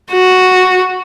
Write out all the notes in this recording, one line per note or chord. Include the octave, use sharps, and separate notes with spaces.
F#4